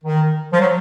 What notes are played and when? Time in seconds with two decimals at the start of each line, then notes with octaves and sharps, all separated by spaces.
0.04 D#3
0.53 F3
0.61 F#3